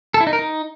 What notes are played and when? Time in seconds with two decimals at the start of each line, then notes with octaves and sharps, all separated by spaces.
0.14 A4
0.21 E4
0.27 D#4
0.33 A#4
0.39 D#4